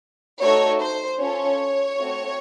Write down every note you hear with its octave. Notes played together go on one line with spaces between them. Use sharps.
A3 D#4 F#4 A4 C#5
C5
C#4 F4 A4 C#5
A3 C4 F#4